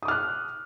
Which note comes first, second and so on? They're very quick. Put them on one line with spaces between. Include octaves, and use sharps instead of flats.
D#6 D6 F6 F#6